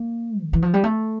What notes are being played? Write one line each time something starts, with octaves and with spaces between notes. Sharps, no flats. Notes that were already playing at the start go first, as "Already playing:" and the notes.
Already playing: A#3
D3
E3
F3
G3
A3